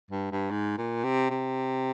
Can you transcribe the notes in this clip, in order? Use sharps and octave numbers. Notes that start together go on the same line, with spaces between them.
G2
G2
G#2
A#2
C3
C3